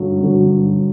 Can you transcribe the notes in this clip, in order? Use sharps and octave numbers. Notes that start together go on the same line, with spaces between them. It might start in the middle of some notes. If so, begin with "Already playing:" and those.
Already playing: G2 D3 F#3
G2 D3 F#3